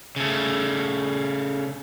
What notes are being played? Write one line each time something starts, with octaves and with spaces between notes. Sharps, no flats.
C#3 A3